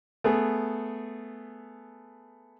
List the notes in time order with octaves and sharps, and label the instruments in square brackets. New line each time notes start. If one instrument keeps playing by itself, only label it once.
[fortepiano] A3 B3 G#4